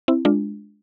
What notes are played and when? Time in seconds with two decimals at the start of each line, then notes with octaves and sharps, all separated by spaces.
0.08 C4 E4
0.25 G#3 D4 F4